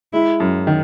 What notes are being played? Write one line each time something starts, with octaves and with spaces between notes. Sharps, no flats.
G#3 E4
F#2
D#3